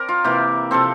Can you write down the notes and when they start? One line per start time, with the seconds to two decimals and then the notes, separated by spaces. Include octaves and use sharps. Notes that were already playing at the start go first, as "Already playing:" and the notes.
Already playing: C4 A#4 D5
0.09 F4
0.24 C3 E3 A#3 G4
0.71 C3 F3 C4 A4